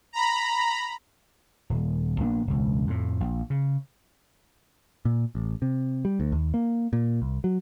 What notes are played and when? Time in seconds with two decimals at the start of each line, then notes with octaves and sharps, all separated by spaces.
0.13 A#5 B5
1.70 D#1
2.20 A#1 A#3 B3 D4
2.47 E1 C#2
2.87 F2 A2
3.20 A#1
3.50 C#3
5.05 A#2
5.35 A1
5.62 C3
6.05 G3
6.20 D2
6.32 D#2
6.54 A#3
6.93 A#2
7.22 C2
7.44 F#3